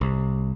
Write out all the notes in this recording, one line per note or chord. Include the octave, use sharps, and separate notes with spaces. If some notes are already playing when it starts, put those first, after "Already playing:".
C2